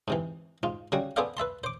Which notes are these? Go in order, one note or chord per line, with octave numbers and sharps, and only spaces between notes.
G#2 C3 E3
G#2 F4
C#3 G3 F#4
B3 G#4 A4 C5 D5 F5
B4 E5 A5 C6
C5 D6